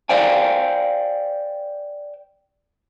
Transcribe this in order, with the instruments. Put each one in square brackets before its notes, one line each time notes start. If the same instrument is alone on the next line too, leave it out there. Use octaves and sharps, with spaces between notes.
[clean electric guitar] C5 D5 F5 G5 G#5